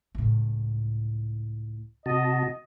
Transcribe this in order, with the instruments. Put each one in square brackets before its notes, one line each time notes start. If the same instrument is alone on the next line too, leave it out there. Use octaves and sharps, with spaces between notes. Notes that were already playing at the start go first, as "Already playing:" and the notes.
[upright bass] C#2 A2
[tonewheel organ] C3 F#4 A5 [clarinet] D#5